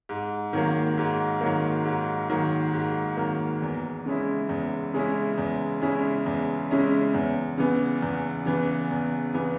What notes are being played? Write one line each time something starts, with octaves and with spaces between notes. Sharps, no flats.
G#2
D#3 F#3 A#3
G#2
D#3 F#3 A#3
G#2
D#3 F#3 A#3
G#2
D#3 F#3 A#3
E2
C#3 G#3 C#4 E4
E2
C#3 G#3 C#4 E4
E2
C#3 G#3 C#4 E4
E2
C#3 G#3 C#4 E4
E2
C#3 E3 B3
E2
C#3 E3 B3
E2
C#3 E3 B3